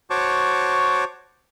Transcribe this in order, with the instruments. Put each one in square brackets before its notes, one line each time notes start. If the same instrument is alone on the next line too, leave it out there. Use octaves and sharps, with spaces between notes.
[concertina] F#4 C5 C#5 A5 C#6 D6